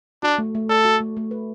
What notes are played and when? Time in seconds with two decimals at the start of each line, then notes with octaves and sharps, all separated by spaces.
0.23 D4 F#4
0.38 A3
0.55 A3
0.69 A4 D5
0.85 F#4
1.01 A3
1.17 A3
1.31 B4